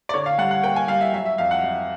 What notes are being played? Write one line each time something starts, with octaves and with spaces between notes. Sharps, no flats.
D5
D3 C#5
F5
G3 F#5
F#5
A#3 G5
G#5
G3 F5
E5
F#3 E5
E5
F2 F5
F#5
F#3